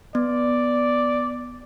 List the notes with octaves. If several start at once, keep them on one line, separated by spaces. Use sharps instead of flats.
B3 D5